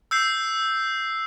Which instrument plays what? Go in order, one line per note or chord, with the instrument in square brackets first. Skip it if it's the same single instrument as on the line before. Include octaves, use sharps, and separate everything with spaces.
[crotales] E6 G6 C7